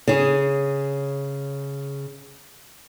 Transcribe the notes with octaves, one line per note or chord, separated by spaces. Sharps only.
C#3 G#4